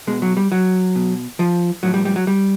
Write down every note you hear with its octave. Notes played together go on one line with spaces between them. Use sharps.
B2 G#3
F#3
G3
F#3
B2
F3
A2 F3 F#3
G3
G3
F#3
G3